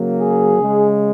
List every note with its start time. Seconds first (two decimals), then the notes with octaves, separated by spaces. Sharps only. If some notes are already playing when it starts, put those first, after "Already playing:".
Already playing: C#3 F#3 A#3
0.21 G#4
0.57 C#3 G#3